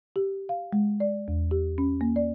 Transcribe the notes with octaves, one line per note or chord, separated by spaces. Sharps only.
G4
F5
G#3
D5
E2
G4
C#4
A#3
D5